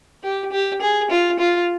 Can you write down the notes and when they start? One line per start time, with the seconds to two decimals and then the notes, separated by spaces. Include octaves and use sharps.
0.23 G4
0.52 G4
0.81 G#4
1.10 F4
1.39 F4